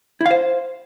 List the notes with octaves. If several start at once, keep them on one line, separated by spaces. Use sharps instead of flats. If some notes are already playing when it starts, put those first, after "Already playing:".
E4
F5
C5